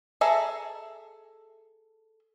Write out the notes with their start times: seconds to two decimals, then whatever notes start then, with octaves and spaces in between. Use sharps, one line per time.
0.21 G#4 A4 E5 A#5